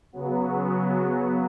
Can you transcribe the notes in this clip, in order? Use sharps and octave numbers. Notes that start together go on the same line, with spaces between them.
C#3 F#3 B3